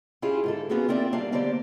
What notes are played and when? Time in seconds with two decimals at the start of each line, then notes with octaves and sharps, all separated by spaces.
0.22 C#4 E4 F4 G4 G#4
0.44 G#2 D3 A4
0.69 A#3 B3 C#4 F4 F#4 G#4
0.88 C4 E4 F4 A#4 D5 E5
1.13 G3 A#3 D4 F5
1.32 D3 A#3 B3 G4 C5 D5